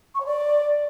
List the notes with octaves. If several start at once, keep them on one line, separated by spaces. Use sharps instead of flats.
C#6
C#5
D5